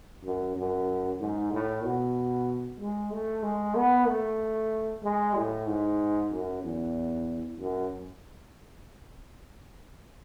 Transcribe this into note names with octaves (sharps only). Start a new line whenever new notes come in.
F#2
F#2
G#2
A2
B2
G#3
A3
G#3
B3
A3
G#3
A2
G#2
F#2
E2
F#2